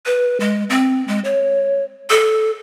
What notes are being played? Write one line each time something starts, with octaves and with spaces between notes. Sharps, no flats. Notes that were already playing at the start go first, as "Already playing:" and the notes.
B4
G#3
C4
G#3
C#5
A4